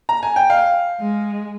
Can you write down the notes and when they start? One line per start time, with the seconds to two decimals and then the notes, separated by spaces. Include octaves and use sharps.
0.09 A#5
0.23 G#5
0.36 G5
0.50 F5
1.00 G#3